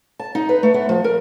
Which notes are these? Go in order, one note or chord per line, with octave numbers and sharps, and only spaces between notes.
A5
D#4
B4
A3
B3
F3
A#4